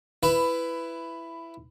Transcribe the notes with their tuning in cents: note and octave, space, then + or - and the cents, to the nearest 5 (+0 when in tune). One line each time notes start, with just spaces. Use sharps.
E4 +15 B4 +10